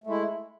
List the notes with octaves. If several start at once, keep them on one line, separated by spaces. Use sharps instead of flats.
G#3 A3 E4